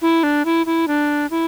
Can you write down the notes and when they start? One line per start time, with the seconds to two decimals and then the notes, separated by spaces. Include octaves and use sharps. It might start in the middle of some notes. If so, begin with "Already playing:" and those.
0.02 E4
0.23 D4
0.45 E4
0.66 E4
0.88 D4
1.31 E4